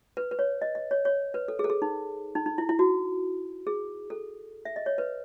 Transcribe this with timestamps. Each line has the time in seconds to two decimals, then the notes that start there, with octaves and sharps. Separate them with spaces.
0.17 B4
0.31 B4
0.39 C#5
0.62 D#5
0.75 D#5
0.91 C#5
1.05 C#5
1.34 B4
1.48 A4
1.59 G#4
1.64 A4
1.70 G#4
1.82 D#4
2.35 D#4
2.46 D#4
2.58 E4
2.69 E4
2.79 F#4
3.67 G#4
4.10 A4
4.65 E5
4.76 D#5
4.86 C#5
4.98 B4